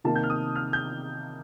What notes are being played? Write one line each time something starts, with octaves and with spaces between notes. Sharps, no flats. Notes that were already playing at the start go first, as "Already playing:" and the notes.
C3 D#3 A#3 A5
G6
F6
D#6
F6
G6